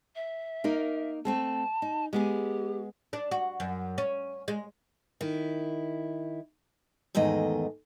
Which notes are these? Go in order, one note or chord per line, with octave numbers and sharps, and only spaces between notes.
E5
A#3 D#4 A#4
A3 C4 A4 A5
D#4
G#3 B3 G4 G#4
D4
F#4
F#2
C#4
G#3
D#3 E4
E2 G#2 D#3 A3 D#5